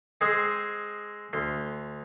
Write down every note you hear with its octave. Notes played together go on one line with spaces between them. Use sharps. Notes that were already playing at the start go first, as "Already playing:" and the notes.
G#3 C4 G#4
D2 C6